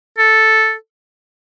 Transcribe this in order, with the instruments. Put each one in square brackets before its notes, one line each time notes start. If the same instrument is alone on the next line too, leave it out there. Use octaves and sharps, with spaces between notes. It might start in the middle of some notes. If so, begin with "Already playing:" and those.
[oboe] A4